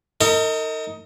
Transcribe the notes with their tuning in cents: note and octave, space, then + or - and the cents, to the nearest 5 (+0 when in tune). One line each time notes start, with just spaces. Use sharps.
D#4 +20 A#4 -45